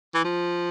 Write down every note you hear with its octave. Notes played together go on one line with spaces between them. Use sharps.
E3
F3